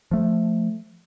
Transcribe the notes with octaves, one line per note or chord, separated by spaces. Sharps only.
F3 A3